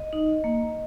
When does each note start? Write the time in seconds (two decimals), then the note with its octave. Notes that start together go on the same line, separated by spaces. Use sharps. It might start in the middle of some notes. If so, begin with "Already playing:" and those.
Already playing: D#5
0.13 D#4
0.44 A#3